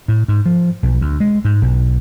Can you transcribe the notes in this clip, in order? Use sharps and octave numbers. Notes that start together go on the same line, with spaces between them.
A2
G#2
F3
B1
D2
G#3
G#2
B1